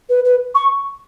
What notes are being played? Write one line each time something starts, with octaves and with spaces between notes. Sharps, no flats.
B4
B4
C#6